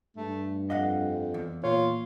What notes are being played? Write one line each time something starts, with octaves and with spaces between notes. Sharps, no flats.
G2 A3
F2 D#5 F5 F#5
E2
A#2 F4 C#5